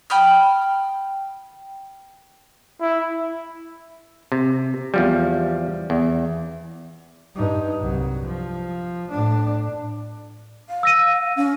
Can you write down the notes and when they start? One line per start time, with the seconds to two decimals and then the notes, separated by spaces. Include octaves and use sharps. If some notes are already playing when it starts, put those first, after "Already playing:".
0.10 G5 B5 D#6 F6
2.81 E4
4.32 C3
4.94 E2 F3 G3
5.90 E2
7.35 G2 D#4
7.80 C2 F#3
8.25 F3
9.10 A2 D4
10.69 F5
10.83 E6 A#6 D#7
11.36 C#4